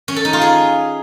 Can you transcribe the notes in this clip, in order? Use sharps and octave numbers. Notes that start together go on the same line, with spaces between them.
C#4
A4
D#4
F4
G#4